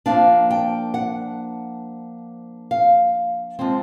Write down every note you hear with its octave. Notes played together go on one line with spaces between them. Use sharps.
F3 A#3 D4 F5
G5
F#5
F5
F3 G#3 C4